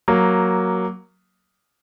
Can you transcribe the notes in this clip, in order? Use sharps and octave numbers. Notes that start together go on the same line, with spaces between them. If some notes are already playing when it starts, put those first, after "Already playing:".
F#3 A#3